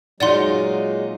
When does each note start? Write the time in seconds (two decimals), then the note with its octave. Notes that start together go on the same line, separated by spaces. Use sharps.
0.20 A#2 F#3 G#3 D#4 F4 D5 F#5 C6